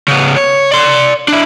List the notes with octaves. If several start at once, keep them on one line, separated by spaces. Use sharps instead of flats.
C#3 B3
C#5
D5 C6
D4 E4